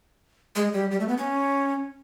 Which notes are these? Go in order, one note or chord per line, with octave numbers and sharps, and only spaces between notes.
G#3
G3
G3
A3
B3
C#4